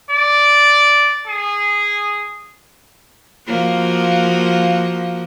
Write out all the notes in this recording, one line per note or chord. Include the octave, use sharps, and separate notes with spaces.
D5
G#4
F3 A#3 F#4